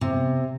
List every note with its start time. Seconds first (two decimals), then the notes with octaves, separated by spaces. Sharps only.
0.01 C3